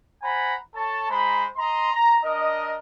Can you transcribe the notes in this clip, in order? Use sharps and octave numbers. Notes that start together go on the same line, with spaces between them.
C5 F#5 G#5 A#5 B5
A4 C#5 A5
G#3 C5 A#5 B5
D#5 A#5 C6
A#5
D4 A#4 D#5